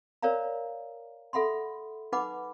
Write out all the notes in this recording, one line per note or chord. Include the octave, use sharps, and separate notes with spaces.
A#4 C#5 D5 F5 A#5
A4 E5 F#5 B5 C6
D#4 B4 F#5 B5 D6